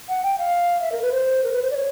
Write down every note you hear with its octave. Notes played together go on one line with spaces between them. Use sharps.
F#5
G5
F5
E5
A#4
B4
C5
A#4
B4
C5
D5
C#5